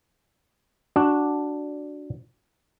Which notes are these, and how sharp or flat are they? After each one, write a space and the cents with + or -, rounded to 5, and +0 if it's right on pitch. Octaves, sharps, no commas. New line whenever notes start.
D4 +0 F#4 +0